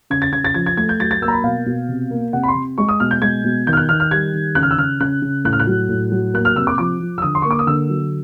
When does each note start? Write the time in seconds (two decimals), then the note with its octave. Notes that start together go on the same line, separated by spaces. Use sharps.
0.10 C#3 G#6
0.22 A6
0.32 C#3 G#6
0.45 A6
0.54 F3 G#6
0.66 G#6
0.77 A3 G#6
0.89 G6
1.00 F#3 A6
1.11 A6
1.21 A#3 E6
1.28 A#5
1.33 B5
1.43 B2 F5
1.66 B2
1.89 C3
2.11 A#3
2.33 C3 F#5
2.43 B5
2.48 C6
2.55 C3
2.78 G#3 C#6
2.89 D#6
3.00 B2 F6
3.11 G6
3.22 G#3 G#6
3.44 B2
3.67 D#3 G6
3.73 F6
3.77 F#6
3.89 D#3 F6
4.00 F6
4.11 G3 G#6
4.34 D#3
4.55 C#3 F#6
4.63 F6
4.71 E6
4.78 C#3 F6
5.00 C#3 F#6
5.22 C#3
5.45 A2 F#6
5.53 F6
5.60 F#6
5.67 F#3
5.89 A2
6.12 F#3
6.34 A#3 F#6
6.45 F6
6.56 C3 E6
6.67 D6
6.78 F3 D6
7.00 F3
7.18 E6
7.22 D3 D#6
7.35 C6
7.42 A#3 C#6
7.51 D6
7.59 D#6
7.67 D3 E6
7.90 F#3